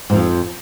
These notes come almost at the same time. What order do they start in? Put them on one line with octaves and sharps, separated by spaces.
G#2 F3 F2